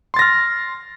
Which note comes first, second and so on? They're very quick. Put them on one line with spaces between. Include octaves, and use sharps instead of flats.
C6 A6 A#6 F6